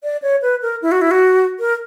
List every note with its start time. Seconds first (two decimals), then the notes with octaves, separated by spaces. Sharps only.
0.03 D5
0.22 C#5
0.42 B4
0.62 A#4
0.82 E4
0.92 F#4
1.01 E4
1.11 F#4
1.60 A#4